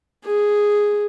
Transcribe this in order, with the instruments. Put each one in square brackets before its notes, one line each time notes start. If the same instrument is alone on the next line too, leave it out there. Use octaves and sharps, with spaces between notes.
[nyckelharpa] G#4